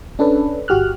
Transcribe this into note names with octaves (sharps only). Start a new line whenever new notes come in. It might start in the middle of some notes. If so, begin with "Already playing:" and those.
C#4 D4 A4 B4
G1 F#4 G4 F6 F#6